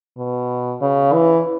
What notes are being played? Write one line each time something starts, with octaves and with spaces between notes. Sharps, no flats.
B2
C#3
E3